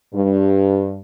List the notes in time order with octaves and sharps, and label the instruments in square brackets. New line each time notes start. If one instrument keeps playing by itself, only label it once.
[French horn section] G2